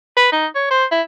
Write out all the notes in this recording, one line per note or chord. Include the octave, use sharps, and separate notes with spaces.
B4
D#4
C#5
C5
E4